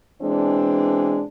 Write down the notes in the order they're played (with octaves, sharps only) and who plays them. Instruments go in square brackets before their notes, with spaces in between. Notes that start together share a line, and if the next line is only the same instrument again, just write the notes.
[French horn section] B2 E3 G#3 C4 D4